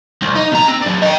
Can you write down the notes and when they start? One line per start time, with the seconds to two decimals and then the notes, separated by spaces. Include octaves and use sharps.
0.22 C2
0.36 D#4
0.52 B2 A#5
0.68 C4
0.82 F#3 D4
1.02 D#5 G5